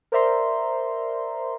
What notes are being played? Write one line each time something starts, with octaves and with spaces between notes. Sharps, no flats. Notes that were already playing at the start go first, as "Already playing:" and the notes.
A#4 C5 D5 E5 A#5 C6